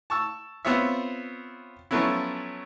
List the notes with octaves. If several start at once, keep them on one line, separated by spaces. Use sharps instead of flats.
A5 C#6 E6
B3 C4 F4 C#5 E5
F3 F#3 A3 B3 C#4 E4